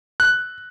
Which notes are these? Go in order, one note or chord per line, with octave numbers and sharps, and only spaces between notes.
F#6